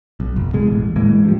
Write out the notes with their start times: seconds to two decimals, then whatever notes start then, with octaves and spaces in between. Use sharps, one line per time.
0.20 B1
0.36 F#1
0.53 E2 B2 G#3
0.67 A1
0.96 A2 E3 G#3 A#3
1.24 G2 F3